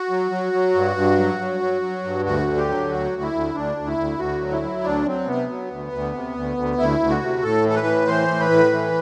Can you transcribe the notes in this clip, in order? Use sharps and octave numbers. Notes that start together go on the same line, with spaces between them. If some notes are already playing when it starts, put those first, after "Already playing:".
Already playing: F#4
F#3
F#3
F#3
G2
G2
F#3
F#3
F#3
F#3
G2
D2 F#4
D3
G4
F#3
D2 F#4
D2
E4
D2
D2 D4
D2
E4
D2
D2 F#4
F#3
E4
F#3
D2 D4
F#3 C4
C3 B3
F#3
D2
D2
C3
D2
D2
D2 E4
D2
F#4
C3
A2 A4
E3 A4
B4
A2
E3 C5
A2
B4
A2
E3